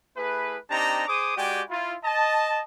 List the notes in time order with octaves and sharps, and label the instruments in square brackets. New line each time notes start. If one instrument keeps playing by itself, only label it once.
[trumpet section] A3 E4 G#4 B4
C4 D4 D#4 G4 A5 A#5
G#4 C5 D6 D#6
G#3 F#4 G4 D5 G5 G#5
E4 F4
D#5 A5